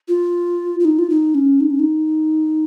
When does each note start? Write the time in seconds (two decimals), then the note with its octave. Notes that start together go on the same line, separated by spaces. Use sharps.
0.08 F4
0.80 F4
0.85 D#4
0.99 F4
1.10 D#4
1.35 C#4
1.60 D#4
1.70 C#4
1.79 D#4